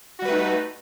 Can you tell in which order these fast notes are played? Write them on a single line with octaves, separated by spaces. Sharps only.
F#4 G3 B4 A3 D#4